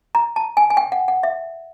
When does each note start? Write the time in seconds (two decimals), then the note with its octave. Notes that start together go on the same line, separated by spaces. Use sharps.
0.15 A#5
0.36 A5
0.57 G#5
0.70 G#5
0.77 G5
0.92 F#5
1.08 F#5
1.23 E5